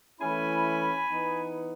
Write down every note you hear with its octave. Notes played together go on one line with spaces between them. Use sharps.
E3 A3 C#4 E4 G#5 B5
E3 B3 D#4